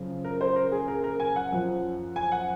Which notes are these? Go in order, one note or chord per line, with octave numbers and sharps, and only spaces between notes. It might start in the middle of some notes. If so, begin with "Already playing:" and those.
Already playing: F#2 C#3 F3
A#4
C5
A#4
G#4
A#4
A#4
G#5
F#5
F#2 F3
G#5
F#5